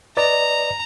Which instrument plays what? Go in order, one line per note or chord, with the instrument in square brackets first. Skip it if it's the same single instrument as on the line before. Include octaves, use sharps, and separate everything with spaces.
[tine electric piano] B4 D5 D#5 [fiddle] A#5